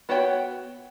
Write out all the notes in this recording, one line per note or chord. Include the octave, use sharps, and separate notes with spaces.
B3 F#4 C#5 G5